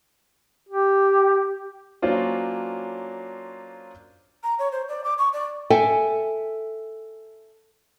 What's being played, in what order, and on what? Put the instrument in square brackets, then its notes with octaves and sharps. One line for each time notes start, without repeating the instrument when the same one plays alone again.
[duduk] G4
[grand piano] F#3 A#3 C#4 D4 F4 C5
[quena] A#5
C#5
C5
D5
D6
C#6
D5
[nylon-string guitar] A4 E5 G5 G#5